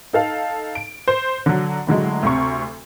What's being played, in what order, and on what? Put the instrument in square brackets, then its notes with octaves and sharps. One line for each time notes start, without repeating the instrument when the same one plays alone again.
[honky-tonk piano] D#4 A4 F5
D7
C5
D3 F#3
A2 D3 F#3 G#3
D2 C3 C#6